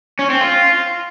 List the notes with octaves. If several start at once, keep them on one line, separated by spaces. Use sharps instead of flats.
C#4
C4
F4